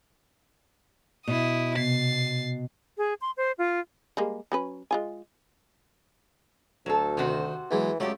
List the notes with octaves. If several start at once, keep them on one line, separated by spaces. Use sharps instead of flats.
B2 E4 D#6
C3 B3 A6 C7
G#4
C6
C5
F4
G3 G#3 A#3
F#3 C#4 B4
G#3 F4 G#5
D2 F#3 A4
C3 D#3 F#4 C5
E2 E3 F#3 G#3
C#2 F#3 A3 G4 D5 D#6